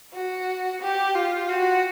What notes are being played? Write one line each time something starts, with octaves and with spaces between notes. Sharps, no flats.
F#4
G4
F4
F#4